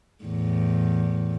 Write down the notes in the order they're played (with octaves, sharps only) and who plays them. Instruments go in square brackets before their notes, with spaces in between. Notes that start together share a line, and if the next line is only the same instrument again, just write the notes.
[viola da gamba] E2 A2